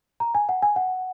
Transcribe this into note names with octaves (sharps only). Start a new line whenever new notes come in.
A#5
G#5
F#5
G#5
F#5